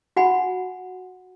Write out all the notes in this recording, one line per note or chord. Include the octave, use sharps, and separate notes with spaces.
F#4 F#5 G#5 B5